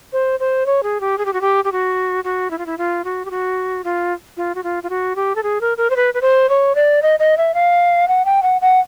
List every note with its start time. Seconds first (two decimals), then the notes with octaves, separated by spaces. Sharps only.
0.13 C5
0.40 C5
0.66 C#5
0.83 G#4
1.01 G4
1.18 G#4
1.26 G4
1.33 F#4
1.41 G4
1.64 G4
1.72 F#4
2.24 F#4
2.51 E4
2.58 F4
2.66 E4
2.78 F4
3.04 F#4
3.25 G4
3.31 F#4
3.84 F4
4.37 F4
4.55 F#4
4.64 F4
4.83 F4
4.90 F#4
5.16 G4
5.36 A4
5.43 G#4
5.61 A#4
5.78 A#4
5.90 C5
5.96 B4
6.14 B4
6.22 C5
6.49 C#5
6.75 D5
7.02 D#5
7.20 D#5
7.37 E5
7.54 F5
8.08 F#5
8.25 G5
8.43 F#5
8.61 F#5